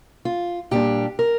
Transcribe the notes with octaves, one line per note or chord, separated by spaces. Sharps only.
F4
A#2 G3 D4 G4
A#4